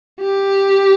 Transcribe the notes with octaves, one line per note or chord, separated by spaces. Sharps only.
G4